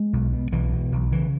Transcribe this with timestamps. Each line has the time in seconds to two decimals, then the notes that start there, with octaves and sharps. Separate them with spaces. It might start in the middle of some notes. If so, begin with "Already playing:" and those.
Already playing: G#3
0.13 B1
0.33 B2
0.52 B1 E3
0.72 B2
0.92 B1
1.12 C#3 E3